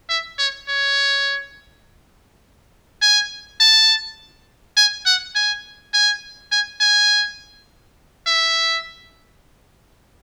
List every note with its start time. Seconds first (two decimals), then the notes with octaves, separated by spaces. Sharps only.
0.09 E5
0.39 C#5
0.68 C#5
3.02 G#5
3.60 A5
4.77 G#5
5.06 F#5
5.35 G#5
5.94 G#5
6.52 G#5
6.81 G#5
8.27 E5